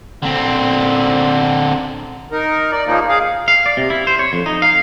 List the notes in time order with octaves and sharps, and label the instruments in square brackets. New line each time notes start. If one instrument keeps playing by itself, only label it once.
[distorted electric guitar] D3 C4
[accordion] D#4 A#4
D5
C#3 F3 A#3 D#4
G#4 F5
[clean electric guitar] F5
D5
C3
E4
C5
C#5
F2
D#4
F5